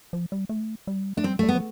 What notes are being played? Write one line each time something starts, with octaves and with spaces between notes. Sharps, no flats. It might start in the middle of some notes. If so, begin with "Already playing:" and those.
F3
G3
A3
G3
A3 D4
G3 C4
G3 A3
B3
F3